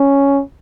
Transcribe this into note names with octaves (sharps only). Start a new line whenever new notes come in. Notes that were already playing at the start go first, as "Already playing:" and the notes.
Already playing: C#4